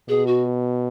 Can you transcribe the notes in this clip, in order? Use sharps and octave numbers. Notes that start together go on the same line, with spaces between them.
B2 G#4
F#4